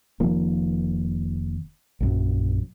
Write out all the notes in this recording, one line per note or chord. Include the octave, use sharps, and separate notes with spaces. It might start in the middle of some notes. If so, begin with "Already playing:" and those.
F1 D#3 F3 A#3
A#1 F#2